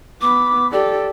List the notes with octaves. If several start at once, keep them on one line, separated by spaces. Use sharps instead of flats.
B3 B5 D6
G4 A4 D5